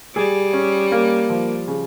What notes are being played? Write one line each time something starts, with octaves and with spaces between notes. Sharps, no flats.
G3 G#4
C#4
A#3
F3
C#3